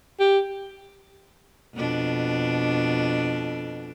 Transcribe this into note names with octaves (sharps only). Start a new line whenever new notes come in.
G4
F2 B2 D4